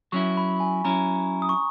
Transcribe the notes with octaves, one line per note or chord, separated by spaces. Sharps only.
F#3 C#4 E4 C#6
B5
G#5
F#3 C#4 E4 A#5
D#6
C#6